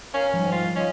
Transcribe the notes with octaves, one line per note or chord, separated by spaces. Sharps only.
C#4 A#4 F5
G#2 D#3 F3 G3
F4
C#4 F4 D#5